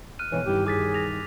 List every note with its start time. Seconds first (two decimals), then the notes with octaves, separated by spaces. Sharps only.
0.19 F6 F#6 D#7
0.32 F2 B2 E3 C#5
0.46 G2 D#3 E4 G4
0.67 G#4 D6 A6 B6
0.94 A#6 F7